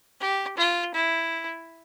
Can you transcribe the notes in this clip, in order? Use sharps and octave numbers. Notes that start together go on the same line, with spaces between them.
G4
F4
E4